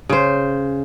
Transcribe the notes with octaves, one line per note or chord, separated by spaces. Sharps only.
C#3 C5